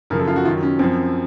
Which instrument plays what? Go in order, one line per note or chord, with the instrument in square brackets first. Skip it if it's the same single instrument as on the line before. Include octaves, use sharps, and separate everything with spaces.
[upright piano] F#2 C#3 F3 A#4
A4
F4
F#4
F#2 D#3 F#3 F4
C#4
F#2 F3 C4